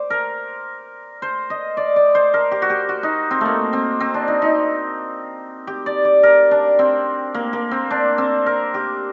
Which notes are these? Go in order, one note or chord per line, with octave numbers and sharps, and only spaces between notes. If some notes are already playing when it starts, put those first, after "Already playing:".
Already playing: C5 D5
A#4
C5
D#5
D5
D5
C5
A#4
G4
F#4
G4
F#4
D#4
C4
A3 A#3
C4
C4
D4
D#4
D#4
G4
D5
D5
A#4
D4
C4
A#3
A#3
C4
D4
C4
A#4
G4